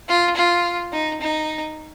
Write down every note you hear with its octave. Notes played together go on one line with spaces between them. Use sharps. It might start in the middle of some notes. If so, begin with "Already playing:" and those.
F4
F4
D#4
D#4